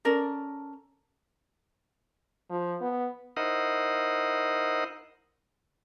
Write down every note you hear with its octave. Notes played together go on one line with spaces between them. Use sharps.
C#4 A4 A#4 D5
F3
B3
D#4 E4 A#4 C5 D#5 F#5